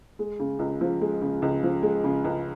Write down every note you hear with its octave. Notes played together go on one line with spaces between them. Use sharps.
G#3
C#3
C#2
F3
G#3
C#3
C#2
F3
G#3
C#3
C#2